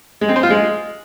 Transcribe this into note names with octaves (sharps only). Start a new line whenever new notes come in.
G#3
C4
C5
F4
G#3